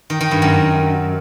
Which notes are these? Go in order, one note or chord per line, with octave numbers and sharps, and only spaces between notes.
D#3
D#3
G2
F#2